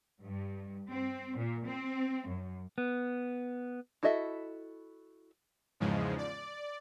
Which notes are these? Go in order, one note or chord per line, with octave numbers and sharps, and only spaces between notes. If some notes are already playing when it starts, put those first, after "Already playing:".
G2
C4
A#2
C4
F#2
B3
E4 F#4 A4 D#5 E5
E2 G#2 C#3 F3 G#3
D5